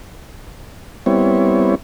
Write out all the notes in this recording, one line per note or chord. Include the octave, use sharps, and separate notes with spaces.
G3 B3 C4 E4 C#5